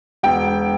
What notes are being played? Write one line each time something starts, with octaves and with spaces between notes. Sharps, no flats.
E1 G5